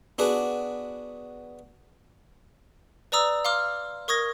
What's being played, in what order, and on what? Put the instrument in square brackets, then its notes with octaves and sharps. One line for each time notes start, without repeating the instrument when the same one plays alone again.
[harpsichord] B3 D4 F#4 G#4
[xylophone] B4 D5 A#5 D#6 E6
F5 C6 D6 F6
A#4 C#6 D#6 G#6 A#6